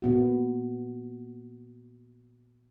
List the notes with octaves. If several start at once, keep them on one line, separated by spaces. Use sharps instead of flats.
A#2 B3 F#4